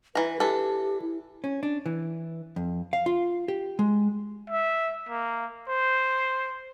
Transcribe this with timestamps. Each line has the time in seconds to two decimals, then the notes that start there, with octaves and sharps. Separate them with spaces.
0.15 E3 B4 A#5
0.40 E3 D4 G4 A4
1.02 E4
1.44 C#4
1.63 D4
1.86 E3
2.56 F2
2.93 F5
3.06 F4
3.48 G4
3.79 G#3
4.50 E5
5.09 A#3
5.68 C5